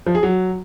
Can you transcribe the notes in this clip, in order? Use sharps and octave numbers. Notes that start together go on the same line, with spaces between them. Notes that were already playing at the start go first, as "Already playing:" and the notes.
F3
G#4
F#3